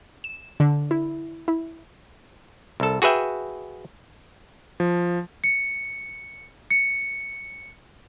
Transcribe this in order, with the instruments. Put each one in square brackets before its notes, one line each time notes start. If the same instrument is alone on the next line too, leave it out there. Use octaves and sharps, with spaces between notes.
[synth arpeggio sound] E7
D3
E4
E4
[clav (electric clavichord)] C2 A4
F#4 G#4 B4 E5 G5
[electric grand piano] F3
[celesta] C#7
C#7